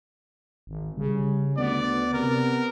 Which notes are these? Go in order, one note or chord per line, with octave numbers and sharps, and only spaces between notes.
G#1
C#3 G3
D2 B3 D5
C3 A#4